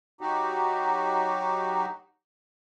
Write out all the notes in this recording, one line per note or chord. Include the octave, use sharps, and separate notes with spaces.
F#3 D#4 F#4 G4